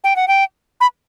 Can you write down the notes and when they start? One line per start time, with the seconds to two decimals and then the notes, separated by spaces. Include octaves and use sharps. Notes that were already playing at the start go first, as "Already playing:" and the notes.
0.04 G5
0.16 F#5
0.28 G5
0.81 B5